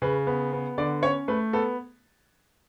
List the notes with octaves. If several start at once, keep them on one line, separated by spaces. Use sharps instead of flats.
C#3 B4
B3
B3
D3 D5
C#4 C#5
A3 B4
B3 A4